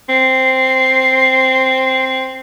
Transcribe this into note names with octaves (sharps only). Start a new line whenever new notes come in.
C4 C7